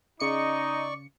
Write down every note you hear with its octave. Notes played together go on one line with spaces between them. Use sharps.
C#3 D#4 D5 D#5 C#6 C#7